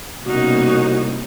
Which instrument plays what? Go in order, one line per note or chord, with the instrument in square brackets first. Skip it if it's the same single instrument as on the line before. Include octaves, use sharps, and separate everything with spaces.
[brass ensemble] C2 [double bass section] B2 [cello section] A#3 C#4 D#4 [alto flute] F#4